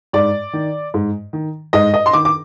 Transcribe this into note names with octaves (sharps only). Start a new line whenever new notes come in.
G#2 D5
D#3
G#2
D#3
G#2 D#5
D#5
C6
D#3 D6
D6